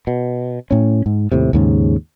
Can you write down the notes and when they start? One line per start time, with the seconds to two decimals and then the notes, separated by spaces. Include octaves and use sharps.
0.07 B2
0.71 A2 C#4
1.06 G#2
1.32 D#2 A2 C3
1.53 D#2 G#2 C#3